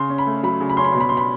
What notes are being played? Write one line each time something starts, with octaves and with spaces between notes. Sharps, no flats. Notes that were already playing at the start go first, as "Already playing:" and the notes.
Already playing: C#3 C6
C#4
B5
A3
F#3 B5
C#3
B5
C#4 C6
B5
B2 C6
B5
B2 C6
B5